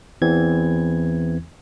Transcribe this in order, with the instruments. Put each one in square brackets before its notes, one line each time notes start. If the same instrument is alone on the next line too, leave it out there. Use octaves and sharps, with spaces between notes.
[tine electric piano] E2 E3 C4 G#6